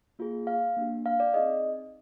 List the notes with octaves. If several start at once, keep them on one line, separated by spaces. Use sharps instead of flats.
A#3 F4 G#4
F5
A#3 D4 G4
F5
D5
C4 D#4 G#4 D#5